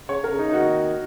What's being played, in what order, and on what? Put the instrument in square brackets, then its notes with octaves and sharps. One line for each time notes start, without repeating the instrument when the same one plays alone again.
[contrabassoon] C#3 [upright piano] C#5
[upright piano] A#4
[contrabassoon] C#3
[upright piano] D#4
D#4
[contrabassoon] D#3 [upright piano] F#4